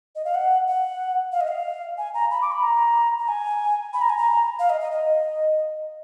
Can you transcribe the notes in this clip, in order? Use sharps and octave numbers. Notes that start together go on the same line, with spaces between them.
D#5
F5
F#5
F#5
F5
D#5
F5
G#5
A#5
B5
D6
B5
A#5
A#5
G#5
B5
A#5
G#5
A#5
F5
D#5
D#5
D#5